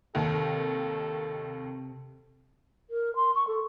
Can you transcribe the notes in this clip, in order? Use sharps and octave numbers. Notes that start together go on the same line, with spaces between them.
D#2 C3 D#3 A4
A#4
C6
C#6
A4